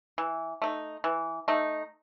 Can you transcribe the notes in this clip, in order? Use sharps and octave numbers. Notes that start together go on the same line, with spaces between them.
E3
A3 D#4
E3
A3 D#4